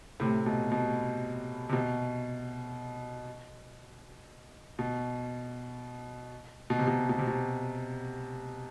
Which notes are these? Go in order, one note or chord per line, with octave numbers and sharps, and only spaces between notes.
A2 C3
B2
B2
C3
B2
B2
B2
C3
B2
B2
C3
B2